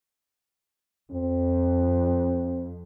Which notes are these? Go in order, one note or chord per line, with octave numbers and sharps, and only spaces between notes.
F2 C4